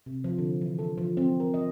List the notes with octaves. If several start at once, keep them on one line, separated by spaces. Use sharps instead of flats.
C3
F3
D3
E3
A4
F3
C4
A#4
D#5